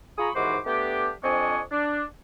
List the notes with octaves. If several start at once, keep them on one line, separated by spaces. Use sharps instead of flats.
F4 G#4 A#5 B5 C#6 D#6
D#2 G#2 E3 F#4 C5 D6
A3 B3 D4 G4
F2 C4 D4 D#5 G#5 C#6
D4